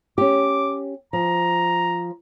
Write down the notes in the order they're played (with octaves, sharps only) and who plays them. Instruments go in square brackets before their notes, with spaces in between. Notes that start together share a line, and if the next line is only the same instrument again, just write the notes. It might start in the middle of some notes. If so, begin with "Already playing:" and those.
[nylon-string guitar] C#4 G4 [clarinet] D6
[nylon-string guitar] F3 [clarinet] A#5